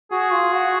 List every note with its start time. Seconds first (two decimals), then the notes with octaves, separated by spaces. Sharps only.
0.11 F#4 G#4
0.32 F4
0.52 F#4